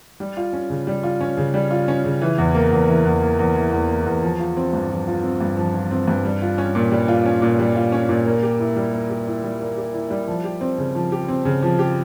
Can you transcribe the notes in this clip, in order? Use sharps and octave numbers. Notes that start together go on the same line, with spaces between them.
G3
F4
C#4
C#3
G3
F4
C#4
C#3
G3
F4
C#4
C#3
E3
E2
A#3
E2
E3
E2
A#3
E2
E3
E2
A#3
E2
F3
F4
C4
G2
F3
F4
C4
G2
F3
F4
C4
G2
G3
F4
C#4
A#2
G3
F4
C#4
A#2
G3
F4
C#4
A#2
A#3
G4
E4
G3
A#3
G4
E4
G3
A#3
G4
E4
G3
F3
G4
C4
C#3
F3
G4
C4
C#3
F3
G4